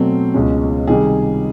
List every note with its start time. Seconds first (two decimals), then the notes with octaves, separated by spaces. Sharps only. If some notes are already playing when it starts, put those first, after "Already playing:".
Already playing: B2 F#3 A3 C4
0.34 C#2 B2 G#3 C#4
0.88 C3 D#3 G3 G#4